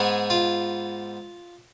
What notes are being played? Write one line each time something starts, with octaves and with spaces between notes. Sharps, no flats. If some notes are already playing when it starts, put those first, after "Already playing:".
Already playing: G#2 G#3 B3 G#4
F4